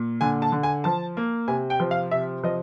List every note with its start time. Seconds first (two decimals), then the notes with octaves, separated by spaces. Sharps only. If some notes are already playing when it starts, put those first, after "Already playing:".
Already playing: A#2
0.21 D3 G#5
0.42 A5
0.52 D3
0.63 G#5
0.84 F3 A5
1.17 A#3
1.48 C3 G#5
1.70 G5
1.80 F3
1.91 F5
2.11 C3 E5
2.44 F3 D#5